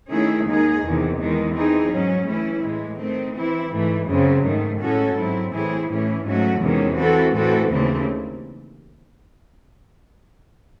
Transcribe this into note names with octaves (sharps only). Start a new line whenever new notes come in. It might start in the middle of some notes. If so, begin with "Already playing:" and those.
D#3 A3 C#4 E4 G#4
D#2 D#3 G#3 D#4 G#4
E2 C3 D#3
E2 D#3 G#3
E3 C4 D#4 G#4
G#2 F#3 C#4
E3 A3 C#4 E4
A2 E3 G#3
D#3 A3 C4
E3 C4 E4
G#2 E3 A3
F#2 C#3 F#3 C4
G#2 D#3 A3
A2 G#3 C#4 F#4 A4
G#2 F#3 C4 E4
A2 E3 C4 E4 G#4
A2 E3 A3 C#4 E4
G#2 F#3 A3 C#4 F#4
E2 C3 D#3 G#3 C#4
E3 C4 F#4 A4
A2 E3 C4 F#4 A4
D#2 C#3 E3 A3 C4